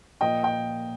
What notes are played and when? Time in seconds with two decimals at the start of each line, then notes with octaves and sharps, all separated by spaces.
0.21 A#2 F3 A#3 D#5 G5
0.43 D#5 G5